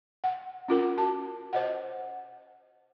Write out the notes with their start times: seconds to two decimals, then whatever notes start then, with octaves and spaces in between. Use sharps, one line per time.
0.24 F#5
0.68 C#4 F4 A#4
0.97 F#4 A5
1.53 C5 D#5 F#5